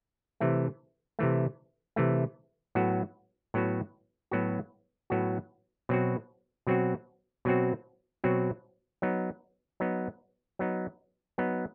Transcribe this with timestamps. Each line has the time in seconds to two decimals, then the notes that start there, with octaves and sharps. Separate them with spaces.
0.41 C3 E3 A3
1.19 C3 E3 A3
1.96 C3 E3 A3
2.75 A2 F#3 B3 F#4
3.54 A2 F#3 B3 F#4
4.31 A2 F#3 B3 F#4
5.10 A2 F#3 B3 F#4
5.89 B2 F#3 C4 F#4
6.67 B2 F#3 C4 F#4
7.45 B2 F#3 C4 F#4
8.24 B2 F#3 C4 F#4
9.02 F#3 B3 D#4
9.80 F#3 B3 D#4
10.59 F#3 B3 D#4
11.38 F#3 B3 D#4